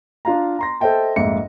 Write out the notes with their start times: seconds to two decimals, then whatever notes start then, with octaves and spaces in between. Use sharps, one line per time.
0.25 D4 F4 F5 A#5
0.59 A#5 C6 A#6
0.81 A4 C5 D#5 E5 G5 A5
1.16 F1 A#1 G#2 E5 C#7